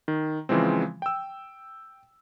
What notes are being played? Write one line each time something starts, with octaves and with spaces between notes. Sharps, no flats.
D#3
C#3 E3 F3 G#3 C4
G5 E6